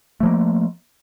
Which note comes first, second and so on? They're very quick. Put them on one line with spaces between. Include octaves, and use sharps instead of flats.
A3 F3 A#3